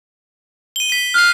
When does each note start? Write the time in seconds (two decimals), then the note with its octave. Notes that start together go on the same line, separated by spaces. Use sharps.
0.76 D#7 G7
0.90 B6 D#7
1.14 F6 F#6 C7